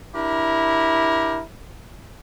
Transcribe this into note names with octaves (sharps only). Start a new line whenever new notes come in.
D4 E4 G4 A#4